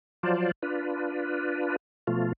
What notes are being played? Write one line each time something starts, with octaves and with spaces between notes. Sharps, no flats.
F3 F#3 F4 C5 D5
D4 F4 B4
B2 F3 A3 F4